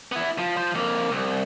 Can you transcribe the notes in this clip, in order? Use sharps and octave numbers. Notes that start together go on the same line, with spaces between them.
B3 E4
F3
F3 C5
F2 A#3
C2